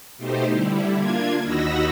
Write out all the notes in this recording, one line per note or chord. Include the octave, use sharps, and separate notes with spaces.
B2 A3 D#4 G4 C5
D3 G3 E4
A#3 D4 F4 G#6
D#2 D#4 F#4 B5 E6 A#6